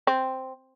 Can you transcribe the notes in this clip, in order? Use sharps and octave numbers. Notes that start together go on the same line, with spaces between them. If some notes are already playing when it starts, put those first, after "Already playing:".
C4